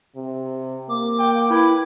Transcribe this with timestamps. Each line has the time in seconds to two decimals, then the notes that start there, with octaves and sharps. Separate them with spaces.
0.16 C3
0.89 A#3 D6
1.19 G5
1.50 E4 B4